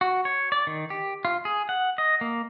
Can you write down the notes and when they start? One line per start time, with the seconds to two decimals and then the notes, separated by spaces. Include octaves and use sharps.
0.01 F#4
0.25 C#5
0.52 D5
0.67 D#3
0.90 G4
1.25 F4
1.45 G#4
1.69 F#5
1.98 D#5
2.21 A#3